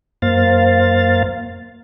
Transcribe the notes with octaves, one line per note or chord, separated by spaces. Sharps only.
F#2 A#3 C5 F5 A6